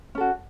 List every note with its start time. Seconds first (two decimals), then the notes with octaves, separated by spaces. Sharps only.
0.15 C#4
0.18 A4
0.20 F#4